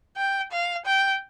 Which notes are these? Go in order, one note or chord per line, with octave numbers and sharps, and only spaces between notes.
G5
F5
G5